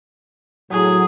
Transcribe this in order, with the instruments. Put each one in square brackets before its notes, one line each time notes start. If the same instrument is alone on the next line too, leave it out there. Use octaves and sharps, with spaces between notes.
[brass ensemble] A2 F#3 [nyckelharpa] G#4